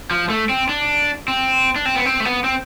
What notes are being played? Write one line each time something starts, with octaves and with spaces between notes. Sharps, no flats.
F3
A3
C4
D4
C4
D4
C4
B3
C4
A3
B3
C4